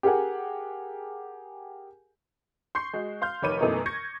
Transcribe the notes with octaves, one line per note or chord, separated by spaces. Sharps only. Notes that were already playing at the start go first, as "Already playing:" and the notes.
G4 G#4 A#4 F#5 G#5
C6 C#6 G6 C7
G#3 F#4
F5 C6 F6 G6
F1 D#3 C#5 B5 D6 D#7
F#2 B2 E3 A3 A#3 D#4
C#6 G6 G#6 A#6 C#7